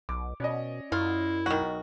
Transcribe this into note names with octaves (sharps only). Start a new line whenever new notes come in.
B1 D6
B2 C#4 D5 D#5
F#2 E4 F4
B1 D#3 F#4